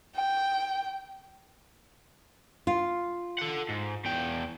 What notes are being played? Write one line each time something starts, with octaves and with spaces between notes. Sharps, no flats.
G5
F4
A4 F#5
G#2
E2 G5